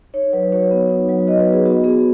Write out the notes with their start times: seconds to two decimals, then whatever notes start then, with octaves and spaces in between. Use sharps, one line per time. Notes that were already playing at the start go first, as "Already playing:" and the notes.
0.14 D#4 C#5
0.33 F#3 B4
0.52 F#4 C#5
0.71 B3
0.90 D#4
1.09 F#3
1.27 F#4 D#5
1.40 B4
1.47 B3
1.53 G#4
1.66 B3 F#4
1.84 B3 G#4